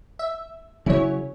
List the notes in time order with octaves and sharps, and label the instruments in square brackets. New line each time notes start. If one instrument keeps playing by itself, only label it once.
[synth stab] E5
[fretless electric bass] C#3 F#3 C#4 [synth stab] E4 C#5